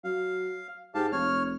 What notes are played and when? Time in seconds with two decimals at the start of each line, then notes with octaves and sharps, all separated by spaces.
0.04 F#3 F5
0.95 G#2 G4 F5 A5
1.12 F1 C#5 F6